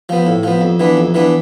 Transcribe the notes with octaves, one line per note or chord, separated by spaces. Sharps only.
F3 B3
A2
F3 B3
F2
E3 B3 D4
F2
E3 B3 D4